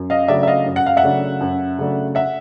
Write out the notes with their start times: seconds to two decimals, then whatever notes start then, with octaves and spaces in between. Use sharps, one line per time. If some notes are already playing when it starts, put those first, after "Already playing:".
Already playing: F#2
0.10 D#5 F5
0.28 C#3 F#3 A3 D4 D5 E5
0.43 E5
0.47 D#5 F5
0.66 F#2
0.76 F#5
0.86 F5
0.97 E5 F#5
1.03 C#3 F#3 A3 D4
1.41 F#2
1.79 C#3 F#3 A3 D4
2.15 E5 F#5